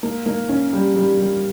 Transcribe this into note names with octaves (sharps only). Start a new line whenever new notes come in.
A#3
A#3
C#4
G3
G3
G3